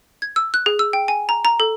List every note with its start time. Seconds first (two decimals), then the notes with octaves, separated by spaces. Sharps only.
0.22 G#6
0.36 E6
0.54 F#6
0.66 G#4
0.79 E6
0.93 G5
1.08 G#5
1.29 A#5
1.45 A#5
1.60 A4